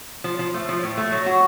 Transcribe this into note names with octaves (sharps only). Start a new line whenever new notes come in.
F3
F3
A3
F3
A2
A3
F#3
F#4